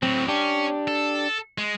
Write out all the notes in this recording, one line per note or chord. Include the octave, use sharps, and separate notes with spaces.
A2 F#3 C4
C#4 D4 G4
A4
G#3